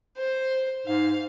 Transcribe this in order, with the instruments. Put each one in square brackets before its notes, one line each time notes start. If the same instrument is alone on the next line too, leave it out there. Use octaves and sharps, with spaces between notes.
[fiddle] C5
[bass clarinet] G#2 [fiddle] F5